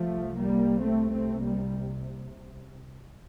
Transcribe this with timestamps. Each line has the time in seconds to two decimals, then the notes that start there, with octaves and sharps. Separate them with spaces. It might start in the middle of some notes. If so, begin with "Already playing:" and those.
Already playing: C2 C3 F3 A3
0.37 G3 A#3
0.82 A3 C4
1.11 A3 C4
1.41 G3 A#3